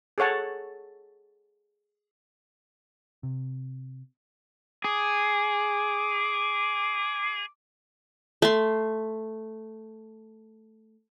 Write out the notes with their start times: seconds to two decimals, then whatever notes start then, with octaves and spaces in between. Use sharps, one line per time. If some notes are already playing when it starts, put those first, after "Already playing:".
0.18 G#4 A4 C#5 F#5 A5
3.23 C3
4.84 G#4 D6
8.42 A3 C6